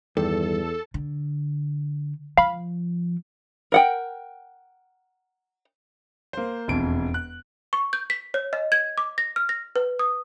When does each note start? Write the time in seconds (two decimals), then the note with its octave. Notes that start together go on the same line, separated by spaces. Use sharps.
0.17 E2 G2 D#3 A4
0.94 D3
2.37 F3 F5 B5
3.72 A#4 F#5 G5
6.33 A#3 C5
6.68 E1 F2 D7
7.14 F#6
7.73 C#6
7.93 G6
8.10 B6
8.34 C#5
8.53 D#5
8.72 G#6
8.98 D6
9.18 A#6
9.36 F6
9.49 A#6
9.76 B4
9.99 D#6